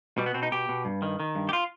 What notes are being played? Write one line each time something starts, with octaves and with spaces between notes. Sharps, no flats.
B2 G3
B3
B2 C4
D#4
B2 G4
B2
G2
D#3
D#3
G2
G4
F4